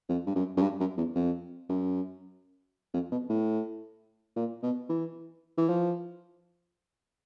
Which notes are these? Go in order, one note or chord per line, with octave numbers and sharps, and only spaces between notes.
F2
G2
F#2
F#2
G2
F#2
E2
F2
F#2
F2
B2
A2
A#2
B2
E3
E3
F3